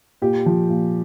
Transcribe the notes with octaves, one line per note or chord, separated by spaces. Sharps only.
A#2 G4
F3
A#2